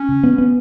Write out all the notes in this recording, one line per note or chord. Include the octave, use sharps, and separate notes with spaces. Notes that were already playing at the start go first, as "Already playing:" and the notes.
Already playing: C#4
C#3
B3
B3